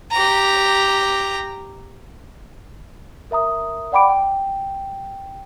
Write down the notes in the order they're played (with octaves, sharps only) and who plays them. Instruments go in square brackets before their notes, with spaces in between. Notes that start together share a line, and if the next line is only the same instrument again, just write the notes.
[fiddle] G4 A#5
[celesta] A#4 E5 A#5 D#6
D5 F#5 G5 B5 D6 D7
G5